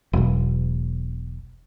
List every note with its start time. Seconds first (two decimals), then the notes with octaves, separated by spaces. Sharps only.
0.13 E1 B1